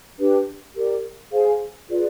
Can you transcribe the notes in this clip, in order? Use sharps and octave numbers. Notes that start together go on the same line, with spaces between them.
D4 G4 B4
G4 A#4 D5
G#4 C5 F5 G#5
F4 G#4 B4 D5